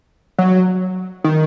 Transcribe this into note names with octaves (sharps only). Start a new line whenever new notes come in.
F#3
D#3